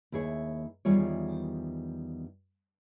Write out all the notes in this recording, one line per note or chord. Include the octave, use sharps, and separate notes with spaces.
D#2 E4 G#4 C#5
E2 D#3 G3 F4 G#4 C#5